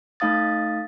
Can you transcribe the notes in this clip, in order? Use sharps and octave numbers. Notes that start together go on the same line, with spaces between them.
A3 D#4 F5 D#6 A6